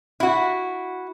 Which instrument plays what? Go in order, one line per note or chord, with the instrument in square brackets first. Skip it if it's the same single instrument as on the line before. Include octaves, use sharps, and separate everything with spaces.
[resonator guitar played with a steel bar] E4 F#4